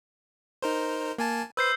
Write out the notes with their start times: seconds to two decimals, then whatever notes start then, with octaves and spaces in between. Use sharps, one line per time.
0.62 D#4 A#4 C5
1.18 A#3 G#5 A5
1.57 B4 C5 E6 G6 C7